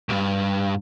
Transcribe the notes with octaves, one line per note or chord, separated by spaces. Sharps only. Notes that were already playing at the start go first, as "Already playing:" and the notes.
C2 G2